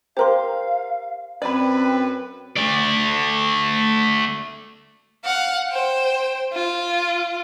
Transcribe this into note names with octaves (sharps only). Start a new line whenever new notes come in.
G4 A#4 C5 F5 C6
F#2 C4 B4 D5 B5
A3 D5
F5 F#5
C5 G5
F4